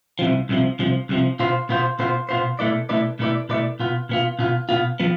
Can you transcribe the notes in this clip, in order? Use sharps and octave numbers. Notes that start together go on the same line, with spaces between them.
C2 C3 F3
C2 C3 F3
C2 C3 F3
C2 C3 F3
B2 B3 F4 C5
B2 B3 F4 C5
B2 B3 F4 C5
B2 B3 F4 C5
B2 A3 E4 B4 D5
B2 A3 E4 B4 D5
B2 A3 E4 B4 D5
B2 A3 E4 B4 D5
B2 B3 F4
B2 B3 F4
B2 B3 F4
B2 B3 F4
F3 B3